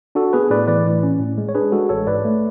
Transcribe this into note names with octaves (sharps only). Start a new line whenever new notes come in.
D4 F#4 A4
B3 G#4 B4
A2 B4 D5
E3 B4 D5
A2
C#4
A2
G#3
C#5
D4 G#4 B4
G#3 F#4 A4
A1 A4 C#5
G#2 B4 D5
A3